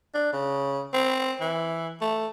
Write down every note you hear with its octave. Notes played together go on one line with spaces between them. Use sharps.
D4
C#3
C4
E3
A3